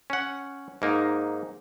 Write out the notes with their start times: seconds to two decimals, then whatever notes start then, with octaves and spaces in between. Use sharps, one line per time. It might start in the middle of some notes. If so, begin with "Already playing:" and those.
0.10 C#4 F#5
0.82 G#2 A#3 D#4